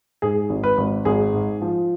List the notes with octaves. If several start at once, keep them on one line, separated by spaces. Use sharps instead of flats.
G#2 G#4
G#1
B4
G#1
G#1 G#4
G#2
F3